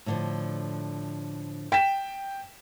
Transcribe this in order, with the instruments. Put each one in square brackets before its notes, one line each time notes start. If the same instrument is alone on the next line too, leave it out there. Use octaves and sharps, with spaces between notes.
[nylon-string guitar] A2 D3 F3
[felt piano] G5 B6 E7